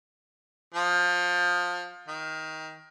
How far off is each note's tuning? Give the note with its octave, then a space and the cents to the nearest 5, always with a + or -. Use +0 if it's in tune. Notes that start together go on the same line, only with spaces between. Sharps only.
F3 +25
D#3 +20